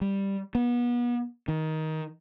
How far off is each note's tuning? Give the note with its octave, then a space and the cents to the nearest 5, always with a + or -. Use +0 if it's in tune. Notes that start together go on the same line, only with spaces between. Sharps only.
G3 +5
B3 -35
D#3 +15